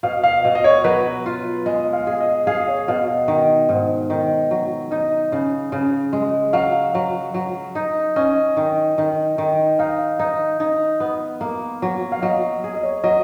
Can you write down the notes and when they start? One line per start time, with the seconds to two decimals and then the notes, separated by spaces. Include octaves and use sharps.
0.03 B2 F5
0.24 F5
0.44 B2 D#5
0.55 D#5
0.64 C#5
0.84 F#3 B4
1.26 F4
1.66 G#3 D#5
1.93 F5
2.07 G#4
2.20 D#5
2.47 G#4 F5
2.68 C#5
2.88 B2 F5
3.09 D#5
3.28 D#3
3.69 G#2
4.10 D#3
4.51 F#3
4.91 D#4 D#5
5.32 C#3
5.72 C#3
6.13 G#3
6.53 F#3 F5
6.95 F#3
7.34 F#3
7.75 D#4
8.16 C#4 D#5
8.57 D#3
8.98 D#3
9.38 D#3
9.79 D#4 F5
10.19 D#4
10.60 D#4
11.00 B3
11.41 A#3
11.82 F#3
12.12 F5
12.22 F#3 D#5
12.64 G#4
12.75 D#5
12.83 C#5
13.04 F#3 D#5